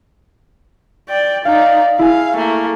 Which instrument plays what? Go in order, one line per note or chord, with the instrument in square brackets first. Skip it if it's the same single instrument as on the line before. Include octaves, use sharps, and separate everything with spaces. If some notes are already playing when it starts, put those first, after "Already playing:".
[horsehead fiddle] D5 G5
[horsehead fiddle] D#4 D5 [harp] F5
[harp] E4 G#4 G#5 [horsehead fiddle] F5
[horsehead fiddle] A3 A#3